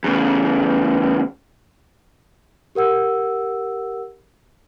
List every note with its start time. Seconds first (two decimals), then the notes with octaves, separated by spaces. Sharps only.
0.04 E2 C#3
2.75 G4 A#4 F#5 E6